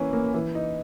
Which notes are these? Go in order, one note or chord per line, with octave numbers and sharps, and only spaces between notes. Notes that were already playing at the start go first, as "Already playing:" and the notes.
Already playing: E3 A#3 C#4 E4
A#3
E3
D#4